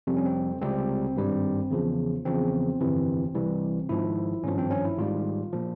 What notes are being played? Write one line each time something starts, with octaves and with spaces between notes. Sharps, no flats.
F2 C3 G3 C4
C#4
C4
C#2 C3 G3 C4
G#1 G2 G3
E2 C#3 F3
E2 C#3 F3 C4
G1 F2 C3 E3
C2 C3 E3 G3
G#1 G#2 F3 E4
G#1 G2 F3 C#4
C4
C#4
E4
G#1 G#2 G3 F4
A#2 F3